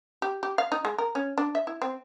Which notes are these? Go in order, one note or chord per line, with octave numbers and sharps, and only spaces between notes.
G4
G4
F5
D#4
G#3
A#4
C#4
D4
E5
E4
C4